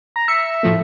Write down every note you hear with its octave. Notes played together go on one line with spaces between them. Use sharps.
A#5
E5 C#7
A2 F3 A3